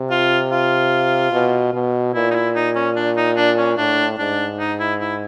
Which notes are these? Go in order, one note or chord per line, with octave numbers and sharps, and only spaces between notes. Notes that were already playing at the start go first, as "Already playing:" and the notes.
Already playing: C3
F4
F4
B2
B2
A#2 E4
D#4
E4
D#4
C#4
D4
D#4
D4
C#4
A2 D4
G#2 D4
D#4
E4
E4